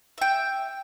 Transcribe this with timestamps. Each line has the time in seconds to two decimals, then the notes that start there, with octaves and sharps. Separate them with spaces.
0.18 E5 G5